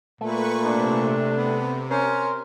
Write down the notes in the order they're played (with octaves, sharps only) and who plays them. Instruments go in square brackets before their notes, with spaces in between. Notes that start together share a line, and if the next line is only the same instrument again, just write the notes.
[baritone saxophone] A#2 [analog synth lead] A3 [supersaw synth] B4 C#6
[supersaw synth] C3 [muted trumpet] D4
[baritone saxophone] B3
[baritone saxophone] C#4 [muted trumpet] A#4 [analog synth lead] C5